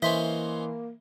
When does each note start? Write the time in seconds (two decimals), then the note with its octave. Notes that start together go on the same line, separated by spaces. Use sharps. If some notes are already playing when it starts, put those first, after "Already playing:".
0.02 E3 A#3 C#4 C5 D#5 E5 C6 B6